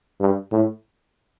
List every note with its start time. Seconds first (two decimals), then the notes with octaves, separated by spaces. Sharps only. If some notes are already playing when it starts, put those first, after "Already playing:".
0.21 G2
0.52 A2